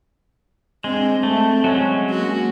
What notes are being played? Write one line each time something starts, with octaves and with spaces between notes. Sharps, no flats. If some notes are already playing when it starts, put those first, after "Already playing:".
G#3 C4 D4
A3 C4
F#3 G#3 C#4
A#3 F#4